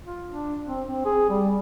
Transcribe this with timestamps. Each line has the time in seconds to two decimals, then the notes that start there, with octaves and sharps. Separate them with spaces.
0.05 F4
0.27 D4
0.67 C4
0.88 C4
1.05 G#4
1.30 G3